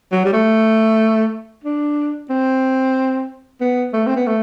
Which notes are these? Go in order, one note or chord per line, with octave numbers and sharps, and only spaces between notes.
F#3
G3
A3
D4
C4
B3
A3
C4
B3
A3